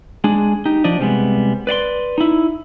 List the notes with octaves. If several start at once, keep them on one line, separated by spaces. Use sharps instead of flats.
G#3 D4 G#4
D#4 G4
F3 D4 D5 D#5
C3 G3 G#3 B3
B4 D5 F5 C6
D#4 E4